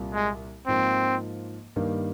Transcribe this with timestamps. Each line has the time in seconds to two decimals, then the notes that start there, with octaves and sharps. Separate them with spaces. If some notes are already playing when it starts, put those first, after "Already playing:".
Already playing: C2 A#2 G3 A#3 F4
0.14 G#3
0.67 G#2 F3 A#3 C4
1.76 G2 D#3 G3 A#3